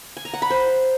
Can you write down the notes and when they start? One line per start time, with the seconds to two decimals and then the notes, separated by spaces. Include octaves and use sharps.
0.17 G#5
0.25 A#5
0.34 F#5
0.42 B5
0.50 C5